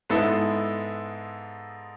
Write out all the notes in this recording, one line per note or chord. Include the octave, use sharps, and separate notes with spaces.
G#2 G#3 B3 E4 A4